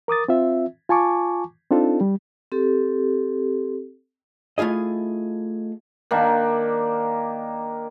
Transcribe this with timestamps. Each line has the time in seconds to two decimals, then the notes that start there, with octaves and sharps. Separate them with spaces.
0.08 A#4 D6 D#6 A6
0.28 C4 F4 E5
0.89 F4 G#5 A5 C#6 D6
1.71 C4 D4 D#4 F4 A4
2.01 G3
2.52 C4 G4 A4
4.58 A3 E4 F4 G#4 D#5
6.11 D#3 A#3 D4